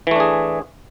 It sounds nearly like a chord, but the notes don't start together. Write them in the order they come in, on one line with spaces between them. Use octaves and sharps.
E3 A3 D4 G#4